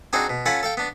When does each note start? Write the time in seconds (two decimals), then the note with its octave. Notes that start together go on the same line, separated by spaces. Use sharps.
0.13 C4 D4 D#4 F#4 G#4 C5
0.29 B2
0.46 C#4 F4 A4 F#5 B5
0.63 A4 F5 G5
0.77 B3 D4